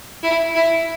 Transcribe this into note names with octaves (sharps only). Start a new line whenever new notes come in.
E4
E4